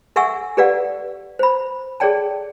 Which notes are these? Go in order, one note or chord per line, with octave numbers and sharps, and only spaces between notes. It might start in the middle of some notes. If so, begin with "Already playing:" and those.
A4 E5 F#5 G#5 C#6 E6
G4 A4 B4 D5 F5 F#5
C5 B5
G#4 A4 C#5 D5 G5 A5